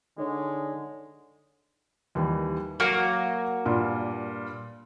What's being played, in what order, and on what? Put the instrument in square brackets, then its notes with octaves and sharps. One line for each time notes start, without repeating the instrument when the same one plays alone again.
[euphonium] D3 [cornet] G#3 [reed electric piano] D#4 C#5 D5
[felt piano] D#2 E3 G3
[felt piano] F#3 C7 [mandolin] A#3 F#4 A#5
[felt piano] G2 A#2